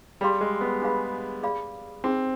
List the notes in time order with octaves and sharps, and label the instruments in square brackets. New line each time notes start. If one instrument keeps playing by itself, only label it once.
[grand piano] G3 [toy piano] G#4 D5 F5 C6
[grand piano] G#3
B3
[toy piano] D4 G#4 B4 F5 B5
G#4 D5 F5 B5
[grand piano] C4 [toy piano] D#4 G#4 C5